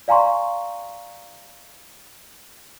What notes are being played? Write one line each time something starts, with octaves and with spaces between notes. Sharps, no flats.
D5 F5 G#5 A#5 C6 C#6